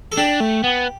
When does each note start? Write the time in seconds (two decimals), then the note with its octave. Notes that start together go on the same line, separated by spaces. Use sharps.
0.12 A4
0.17 D4 G4
0.40 A3
0.64 B3